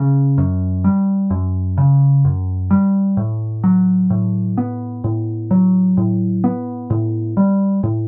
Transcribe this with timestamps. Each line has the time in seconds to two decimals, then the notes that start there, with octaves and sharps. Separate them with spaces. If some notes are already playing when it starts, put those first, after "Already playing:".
Already playing: C#3
0.38 F#2
0.84 G3
1.30 F#2
1.78 C#3
2.25 F#2
2.71 G3
3.17 A2
3.64 F#3
4.10 A2
4.58 B3
5.04 A2
5.51 F#3
5.97 A2
6.44 B3
6.90 A2
7.37 G3
7.83 A2